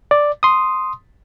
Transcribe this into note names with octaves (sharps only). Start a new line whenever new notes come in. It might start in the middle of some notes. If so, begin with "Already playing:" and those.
D5
C6 D#6